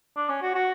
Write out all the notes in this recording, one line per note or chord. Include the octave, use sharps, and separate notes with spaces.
D4
C#4
F#4
F#4